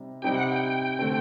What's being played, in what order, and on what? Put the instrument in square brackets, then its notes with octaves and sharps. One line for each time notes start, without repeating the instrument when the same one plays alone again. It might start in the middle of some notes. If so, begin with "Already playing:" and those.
Already playing: [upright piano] C3 G3 C4 D#4
[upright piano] C3 G3 C4 D#4 G4 [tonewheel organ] G5
[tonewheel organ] F#5
G5
[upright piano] D3 A3 C4